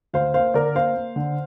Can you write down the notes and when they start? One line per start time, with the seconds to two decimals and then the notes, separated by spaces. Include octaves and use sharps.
0.13 D2 C5 F5
0.34 A#3 C5 F5
0.54 D3 A#4 D5
0.75 A#3 C5 F5
0.96 A#3
1.16 D3